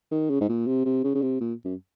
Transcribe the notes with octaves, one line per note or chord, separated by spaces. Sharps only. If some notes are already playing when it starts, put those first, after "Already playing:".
D#3
C#3
G#2
A#2
C3
C3
C#3
C#3
C3
A#2
F#2